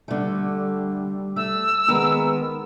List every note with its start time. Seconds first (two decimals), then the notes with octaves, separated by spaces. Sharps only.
0.08 D3 G3 A3
1.36 A3 E6
1.88 D#3 G#3 B3 A#4